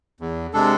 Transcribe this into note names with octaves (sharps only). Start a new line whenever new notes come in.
E2
C3 G#3 D4 A4